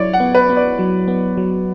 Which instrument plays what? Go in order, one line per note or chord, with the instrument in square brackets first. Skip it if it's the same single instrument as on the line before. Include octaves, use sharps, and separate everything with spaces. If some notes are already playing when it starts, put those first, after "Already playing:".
Already playing: [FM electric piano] F#3 E4 [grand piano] C#5 D5
[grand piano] F#5
[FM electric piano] B3
[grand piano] B4
[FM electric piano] B3
[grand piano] D5
[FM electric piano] F#3
B3
F#3